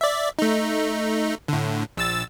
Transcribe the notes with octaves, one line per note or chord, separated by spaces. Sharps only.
D5 E5
A3 D#4
A2 D3
A#1 E6 A6